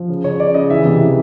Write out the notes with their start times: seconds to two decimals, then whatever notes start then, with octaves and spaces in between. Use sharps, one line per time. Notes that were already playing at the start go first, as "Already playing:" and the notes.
Already playing: F3
0.09 C#3
0.24 C#3 C#5
0.40 C#3 D5
0.54 C#3 D#5
0.70 E3 E5
0.85 C3
1.01 E3